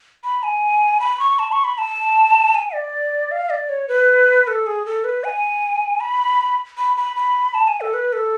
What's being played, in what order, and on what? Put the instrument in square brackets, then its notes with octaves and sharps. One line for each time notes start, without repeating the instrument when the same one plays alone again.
[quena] B5
G#5
B5
C#6
A5
C#6
B5
A5
G#5
D5
F5
D5
C#5
B4
A4
G#4
A4
B4
G#5
B5
B5
B5
B5
A5
G#5
A4
B4
A4